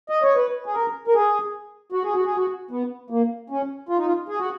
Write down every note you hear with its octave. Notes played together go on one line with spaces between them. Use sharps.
D#5
C#5
B4
G#4
A#4
A#4
G#4
F#4
G#4
F#4
G#4
F#4
B3
A#3
C#4
F4
D#4
F4
G#4
F#4